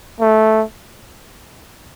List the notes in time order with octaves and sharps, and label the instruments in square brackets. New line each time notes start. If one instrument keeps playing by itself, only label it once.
[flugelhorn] A3